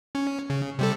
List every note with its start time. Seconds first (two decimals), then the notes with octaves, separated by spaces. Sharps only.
0.15 C#4
0.50 C#3
0.79 C3 G3 A4